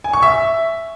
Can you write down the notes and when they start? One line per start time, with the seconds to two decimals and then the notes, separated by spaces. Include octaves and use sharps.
0.04 G#5
0.13 C#6
0.23 E5